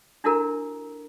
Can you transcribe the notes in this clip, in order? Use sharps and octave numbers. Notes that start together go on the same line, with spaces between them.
D4 E4 F#4 A4 A#4 A#5